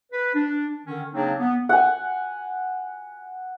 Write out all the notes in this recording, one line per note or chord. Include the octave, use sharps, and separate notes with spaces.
B4
D4
D3 D#3 C#4
C#3 F#3 A#3 C4 D4 D#4
B3
F#5 G#5